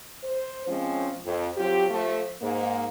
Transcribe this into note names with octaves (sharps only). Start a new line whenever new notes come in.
C5
F3 G#3 C4 C#4
F2
F#3 C4 F4 G4
F3 A3
G#2 A#3